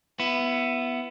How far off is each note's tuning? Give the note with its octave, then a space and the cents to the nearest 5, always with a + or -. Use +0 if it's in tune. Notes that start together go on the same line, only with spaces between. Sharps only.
B3 +0 E4 +20